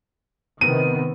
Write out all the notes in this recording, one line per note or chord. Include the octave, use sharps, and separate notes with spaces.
C3 D#3 B3 D#7